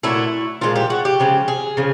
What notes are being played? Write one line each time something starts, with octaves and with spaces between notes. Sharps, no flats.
A#2 F#3 A3 E4
A#2 F3 G#3 F4
G4
F#4
G4
C#3 F3 G#3
G#4
C#3 F3